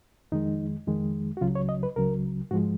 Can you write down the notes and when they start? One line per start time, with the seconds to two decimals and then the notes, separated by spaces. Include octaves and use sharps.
0.32 F2 D#3 G#3 D#4
0.87 F2 D#3 G#3
1.37 F#4
1.41 C#2 C#3 F#3 F4
1.55 C#5
1.69 D#5
1.83 B4
1.96 C#2 C#3 F#3 A#4
2.51 G#2 F3 G#3 F#4